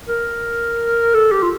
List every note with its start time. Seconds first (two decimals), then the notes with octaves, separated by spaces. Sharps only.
0.09 A#4
1.14 A4
1.32 G4
1.43 F4